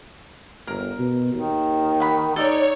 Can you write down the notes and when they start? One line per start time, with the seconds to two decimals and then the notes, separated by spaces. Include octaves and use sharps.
0.67 G1 A#4
0.98 B2
1.34 D#2 D#3
2.00 F#5 B5
2.36 D#4 A4 C#5 D5